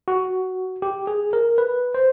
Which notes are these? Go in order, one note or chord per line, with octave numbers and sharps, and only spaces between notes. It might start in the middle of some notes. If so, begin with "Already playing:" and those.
F#4
G4
G#4
A#4
B4
C5